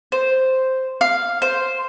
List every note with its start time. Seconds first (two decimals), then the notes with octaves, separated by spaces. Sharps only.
0.12 C5
1.01 F5
1.42 C5